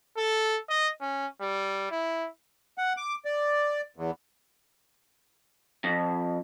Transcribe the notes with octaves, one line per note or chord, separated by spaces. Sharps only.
A4
D#5
C#4
G3
E4
F#5
D6
D5
E2
F2